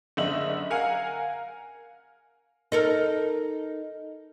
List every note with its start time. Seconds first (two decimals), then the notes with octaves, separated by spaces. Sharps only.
0.17 F#1 D3 D#5 E5 F#7
0.70 A#4 F5 F#5 G#5
2.72 D#4 A4 A#4